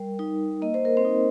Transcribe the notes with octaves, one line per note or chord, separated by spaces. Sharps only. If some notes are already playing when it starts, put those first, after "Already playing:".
Already playing: G3 A#4
D#4
A#3 D#5
C5
A#4
C4 C5
D#4